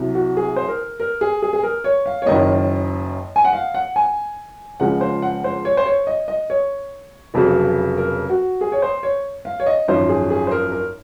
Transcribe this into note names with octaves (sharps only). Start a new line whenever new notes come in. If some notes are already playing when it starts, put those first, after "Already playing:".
Already playing: C2 C3 F#3
F#4
G#4
C5
A#4
A#4
G#4
G#4
G#4
A#4
C#5
F5
C#5
F#1 F#2 D#3 A#3 D#5
G#5
F#5
F5
F#5
G#5
C#2 C#3 F3 G#3 F#5
C5
F#5
C5
C#5
C5
C#5
D#5
D#5
C#5
F1 F2 C#3 F#3
A#4
F#4
G#4
C#5
C5
C#5
F5
C#5
D#5
G#1 F#2 F3 C5
G#4
G#4
C5
A#4
A#4